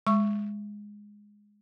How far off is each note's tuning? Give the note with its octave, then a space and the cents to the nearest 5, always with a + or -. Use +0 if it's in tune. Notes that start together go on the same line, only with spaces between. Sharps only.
G#3 -5 C#6 +0